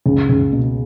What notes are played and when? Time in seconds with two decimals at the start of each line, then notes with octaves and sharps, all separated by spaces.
0.06 C#2
0.29 C#2
0.52 B2